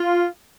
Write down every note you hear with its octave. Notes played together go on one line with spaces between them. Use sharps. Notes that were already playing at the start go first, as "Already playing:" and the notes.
Already playing: F4